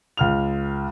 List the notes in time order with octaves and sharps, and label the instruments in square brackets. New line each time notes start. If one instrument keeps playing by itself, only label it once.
[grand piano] C#2 F6 F7